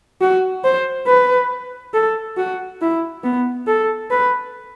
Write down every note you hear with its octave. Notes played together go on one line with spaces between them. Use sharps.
F#4
C5
B4
A4
F#4
E4
B3
A4
B4